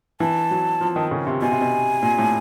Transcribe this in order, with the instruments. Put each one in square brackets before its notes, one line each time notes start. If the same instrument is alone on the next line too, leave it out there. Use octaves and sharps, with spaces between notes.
[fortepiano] E3 [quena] A5
[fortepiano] F#3
F3
D#3
C#3
C3
[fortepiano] B2 [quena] G#5
[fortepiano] C3
B2
A#2
A2